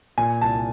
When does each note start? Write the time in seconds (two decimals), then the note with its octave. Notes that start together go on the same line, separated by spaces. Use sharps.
0.18 A#2 G#5
0.41 C2 A5